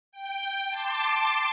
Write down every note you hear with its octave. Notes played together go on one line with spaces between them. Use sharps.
G5
A5 C6 D6